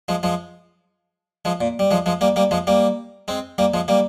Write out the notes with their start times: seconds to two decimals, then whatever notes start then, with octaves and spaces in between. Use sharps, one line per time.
0.08 F3 G#3
0.23 F3 G#3
1.45 F3 G#3
1.61 A#2
1.79 G3
1.91 F3 G#3
2.06 F3 G#3
2.21 G3 A#3
2.36 G3 A#3
2.51 F3 G#3
2.67 G3 A#3
3.28 G#3 C4
3.58 G3 A#3
3.74 F3 G#3
3.88 G3 A#3